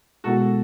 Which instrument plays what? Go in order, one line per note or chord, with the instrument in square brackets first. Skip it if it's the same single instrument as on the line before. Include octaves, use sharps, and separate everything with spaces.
[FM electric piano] B2 G#3 B3 E4 [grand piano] F#4 A4